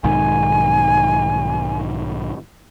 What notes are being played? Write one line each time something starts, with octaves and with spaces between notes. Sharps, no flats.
B1 G#2 D#3 G#5